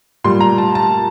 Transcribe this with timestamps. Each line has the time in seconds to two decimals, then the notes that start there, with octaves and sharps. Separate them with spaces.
0.24 A#2 G3 C6
0.41 A#5
0.58 A5
0.75 A5